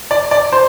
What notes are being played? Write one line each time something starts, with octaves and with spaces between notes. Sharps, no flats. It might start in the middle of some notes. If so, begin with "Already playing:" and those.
D5
D5
C5